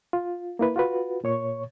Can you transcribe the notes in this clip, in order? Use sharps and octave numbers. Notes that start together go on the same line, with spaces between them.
F4
A#3 E4 B4
F4 F#4 B4
A#2 C#5 C#6